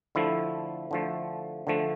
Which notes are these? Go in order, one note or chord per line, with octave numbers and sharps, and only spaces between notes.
D3 F3 A3 E4
D3 F3 A3
D3 F3 A3